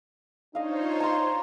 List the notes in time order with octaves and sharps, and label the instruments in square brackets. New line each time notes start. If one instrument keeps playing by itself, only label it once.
[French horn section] D4 D#4 [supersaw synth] F4 C5 C#5 [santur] D#5 F5
[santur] A#5 C6